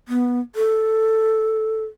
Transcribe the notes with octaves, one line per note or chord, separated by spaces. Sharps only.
B3
A4